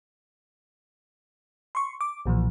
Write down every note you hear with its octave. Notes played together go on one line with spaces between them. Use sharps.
C6 C#6
D6
B1 A#2 E3 F3